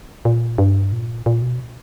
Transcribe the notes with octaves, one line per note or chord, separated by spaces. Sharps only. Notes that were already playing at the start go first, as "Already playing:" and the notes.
A#2
G2
A#2
A#2
B2